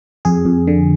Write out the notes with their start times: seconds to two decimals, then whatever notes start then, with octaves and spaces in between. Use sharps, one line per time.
0.25 F2 G#4
0.45 F2
0.68 D3